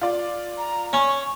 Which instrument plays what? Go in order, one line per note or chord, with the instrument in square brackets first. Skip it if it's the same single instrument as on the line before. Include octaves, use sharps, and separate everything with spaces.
[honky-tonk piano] F4 D5
[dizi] A#5
[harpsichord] C#4 [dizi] C#6